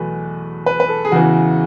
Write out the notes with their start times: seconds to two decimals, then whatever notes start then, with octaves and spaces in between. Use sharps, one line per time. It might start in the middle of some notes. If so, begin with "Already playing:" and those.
Already playing: E2 B2 F#3 A3 B4
0.66 B4
0.80 B4
0.89 A4
1.05 G#4
1.12 E2 C#3 E3 F#4